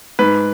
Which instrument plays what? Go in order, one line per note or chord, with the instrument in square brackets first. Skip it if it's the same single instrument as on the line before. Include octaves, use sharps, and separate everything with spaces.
[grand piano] G#2 B4